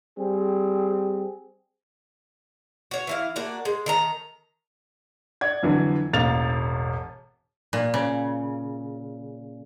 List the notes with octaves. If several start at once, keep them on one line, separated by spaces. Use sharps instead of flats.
G3 C4 G#4
F#4 C#5
E3 E4 F5
A#3 D4 F#4
G#3
D#3 A4 A#5
D5 F#5 G#6
F2 D3 E3 F#3
E1 A1 A#3 A6 F7
A#2
C#3